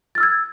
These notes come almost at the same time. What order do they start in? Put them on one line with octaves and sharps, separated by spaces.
A6 F6 E6 G#6